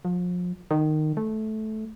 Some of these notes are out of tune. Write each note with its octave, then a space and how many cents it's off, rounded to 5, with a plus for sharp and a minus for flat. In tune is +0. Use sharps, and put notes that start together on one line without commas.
F3 +35
D#3 -15
A3 -15